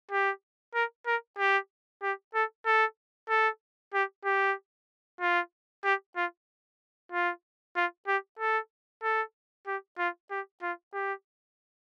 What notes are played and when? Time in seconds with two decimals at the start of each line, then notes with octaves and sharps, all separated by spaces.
0.11 G4
0.75 A#4
1.07 A#4
1.38 G4
2.03 G4
2.34 A4
2.66 A4
3.29 A4
3.94 G4
4.25 G4
5.21 F4
5.84 G4
6.16 F4
7.12 F4
7.76 F4
8.07 G4
8.39 A4
9.03 A4
9.67 G4
9.99 F4
10.31 G4
10.62 F4
10.94 G4